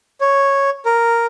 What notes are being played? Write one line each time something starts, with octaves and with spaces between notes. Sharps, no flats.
C#5
A#4